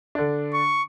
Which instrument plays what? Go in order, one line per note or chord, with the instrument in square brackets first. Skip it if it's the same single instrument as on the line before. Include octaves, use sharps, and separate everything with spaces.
[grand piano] D3 D4
[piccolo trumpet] C#6